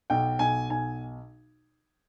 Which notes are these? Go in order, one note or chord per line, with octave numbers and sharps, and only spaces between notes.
B1 G5
B1 G#5
B1 G#5